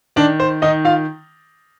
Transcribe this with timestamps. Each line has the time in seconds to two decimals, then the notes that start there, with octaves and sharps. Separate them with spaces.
0.16 D#3 D4 D5
0.40 C5
0.62 D#3 D#4 D#5
0.85 F4 F5